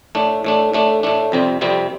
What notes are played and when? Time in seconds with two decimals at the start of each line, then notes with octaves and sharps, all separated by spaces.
0.15 A2 A3 D4
0.44 A2 A3 D4
0.73 A2 A3 D4
1.03 A2 A3 D4
1.32 F2 C3 G3 C4
1.61 F2 C3 G3 C4